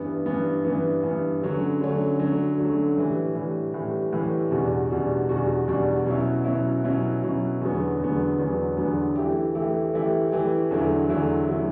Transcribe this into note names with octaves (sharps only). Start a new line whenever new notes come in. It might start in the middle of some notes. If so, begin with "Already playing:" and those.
Already playing: G2 E3 B3
G2 E3 B3
G2 E3 B3
G2 E3 B3
D3 F#3 A3 C#4
D3 F#3 A3 C#4
D3 F#3 A3 C#4
D3 F#3 A3 C#4
A2 E3 G3
A2 E3 G3
A2 E3 G3
A2 E3 G3
E2 B2 G3 D4 F#4
E2 B2 G3 D4 F#4
E2 B2 G3 D4 F#4
E2 B2 G3 D4 F#4
B2 F#3 C#4 E4
B2 F#3 C#4 E4
B2 F#3 C#4 E4
B2 F#3 C#4 E4
E2 D3 F#3 B3
E2 D3 F#3 B3
E2 D3 F#3 B3
E2 D3 F#3 B3
E3 A3 E4 G4
E3 A3 E4 G4
E3 A3 E4 G4
E3 A3 E4 G4
E2 D3 F#3 A3 E4
E2 D3 F#3 A3 E4
D3 F#3 A3 E4